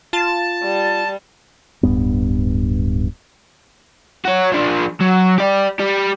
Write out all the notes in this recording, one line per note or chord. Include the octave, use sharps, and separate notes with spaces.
F4 A5
G3
D1 G2 B3
F#4 C#5
F3 D4
F#3
G4 D5
G3 G4